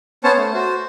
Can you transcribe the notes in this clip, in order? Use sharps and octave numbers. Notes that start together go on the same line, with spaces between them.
B3 C#4 C5 C#5 A5
A3
F#4 C5